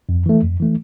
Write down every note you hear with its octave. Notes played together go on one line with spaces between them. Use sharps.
F2
E3 A3
F2
E3 A3